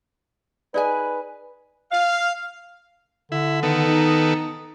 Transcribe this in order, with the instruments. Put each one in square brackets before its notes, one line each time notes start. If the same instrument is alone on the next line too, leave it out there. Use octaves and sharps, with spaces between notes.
[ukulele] D#4 G#4 G#5 [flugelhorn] B4 [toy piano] D5
[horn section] F5
[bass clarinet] D3 [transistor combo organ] E4
[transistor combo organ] D#3 B3 A4
[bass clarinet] D#4